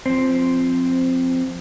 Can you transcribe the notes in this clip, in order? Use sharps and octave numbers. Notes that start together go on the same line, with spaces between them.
F3 C4